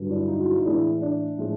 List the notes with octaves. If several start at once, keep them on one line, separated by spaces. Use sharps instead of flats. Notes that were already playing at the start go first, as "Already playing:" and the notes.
Already playing: G2 D3 F#3
D4 E4
D#4 F4
E4 F#4
D#4 F4
A2 E3 G#3 D4 E4
D4
A2 F3 G#3